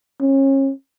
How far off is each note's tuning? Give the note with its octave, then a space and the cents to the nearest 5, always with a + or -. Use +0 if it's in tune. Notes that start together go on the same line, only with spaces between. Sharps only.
C#4 -35